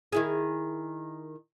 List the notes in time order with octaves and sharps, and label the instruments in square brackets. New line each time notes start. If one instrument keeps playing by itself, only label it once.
[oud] D#3 E4 G#4